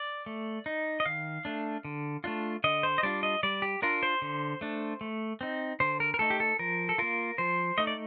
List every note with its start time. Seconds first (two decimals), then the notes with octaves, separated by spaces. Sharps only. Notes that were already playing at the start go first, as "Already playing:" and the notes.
Already playing: D5
0.26 A3
0.66 D#4
1.00 D#5
1.06 D#3 F5
1.45 A3 D4
1.85 D3
2.24 A3 D4 F4
2.64 D3 D#5
2.83 C5
2.98 D#5
3.03 G3 D4 F4 D5
3.23 D#5
3.43 G3 D5
3.62 G4
3.82 D4 F4 A#4
4.03 C5
4.22 D3
4.61 A3 D4
5.01 A3
5.41 C4 D#4
5.80 D3 C5
6.00 A#4
6.14 A#4
6.19 A3 D#4 A4
6.30 G4
6.40 A4
6.59 F3 A#4
6.89 A4
6.98 A#3 F4 A#4
7.38 F3 C5
7.78 A3 D#4 D#5
7.87 D5